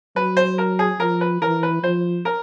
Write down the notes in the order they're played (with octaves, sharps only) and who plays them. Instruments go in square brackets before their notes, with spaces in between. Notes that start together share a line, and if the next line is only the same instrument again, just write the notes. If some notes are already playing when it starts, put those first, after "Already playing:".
[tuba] F#3 [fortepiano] B4
[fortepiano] C5
A#4
G#4
[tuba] F3 [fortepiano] A#4
[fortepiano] B4
[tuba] E3 [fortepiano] A#4
[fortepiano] B4
[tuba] F3 [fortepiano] C5
[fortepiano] A#4